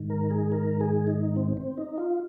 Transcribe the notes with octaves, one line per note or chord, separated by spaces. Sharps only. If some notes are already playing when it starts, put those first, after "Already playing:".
Already playing: G#2 D#3
A#4
G#4
A#4
G#4
D#4
C4
C4
D#4
F4